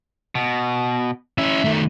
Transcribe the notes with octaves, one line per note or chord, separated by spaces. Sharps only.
B2
C#4 E4 E5
D#3 A3